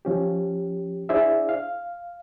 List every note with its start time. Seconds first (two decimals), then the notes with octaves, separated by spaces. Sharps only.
0.05 F3 C#4 G4
1.09 D4 E4 G#4 C5 D5 E5
1.49 F5